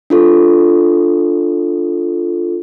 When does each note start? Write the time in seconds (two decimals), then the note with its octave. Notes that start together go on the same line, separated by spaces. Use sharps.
0.10 D4 F4 A4